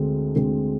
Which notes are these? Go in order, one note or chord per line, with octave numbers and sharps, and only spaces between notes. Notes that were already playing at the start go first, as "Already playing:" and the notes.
Already playing: D2 D3 G#3 C4
D2 D3 G#3 C4